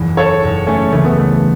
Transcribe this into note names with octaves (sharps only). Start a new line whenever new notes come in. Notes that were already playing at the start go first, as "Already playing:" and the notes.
Already playing: F#1 E2 B2 E3
A4 C#5
F#1 E2 B2
A3 C#4
C#2 C#3 E3 A3
B3
A3